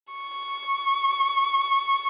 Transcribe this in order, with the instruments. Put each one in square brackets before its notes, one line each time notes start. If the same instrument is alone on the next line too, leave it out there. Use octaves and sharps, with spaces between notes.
[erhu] C#6